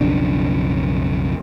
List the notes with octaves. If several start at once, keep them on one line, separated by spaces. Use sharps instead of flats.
B1 F2 C#3 D4